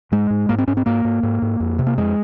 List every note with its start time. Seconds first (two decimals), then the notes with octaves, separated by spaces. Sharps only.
0.12 G#2 G#3
0.30 G#2
0.49 G#2 A#3
0.58 C4
0.68 G#2 C#4
0.77 C4
0.86 G#2 A#3
1.05 G#2
1.23 G#2
1.42 G#2
1.60 F2
1.79 C3
1.87 A#3
1.97 F2 G#3